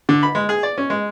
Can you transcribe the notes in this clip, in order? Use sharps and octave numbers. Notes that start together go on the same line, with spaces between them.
D3
B5
G#3
G#4
D5
C#4
G#3